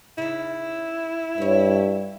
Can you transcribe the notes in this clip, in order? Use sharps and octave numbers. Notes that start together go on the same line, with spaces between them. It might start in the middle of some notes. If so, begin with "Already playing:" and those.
C#3 D#4 E4
G2 B4 C#5